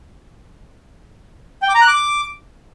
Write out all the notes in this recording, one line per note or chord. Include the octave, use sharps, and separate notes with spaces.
G5
D6
A#5
F#6
D6